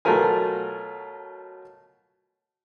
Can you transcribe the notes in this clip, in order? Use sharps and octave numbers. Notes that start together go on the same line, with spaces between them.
B2 F#3 A3 F4 A#4 G#5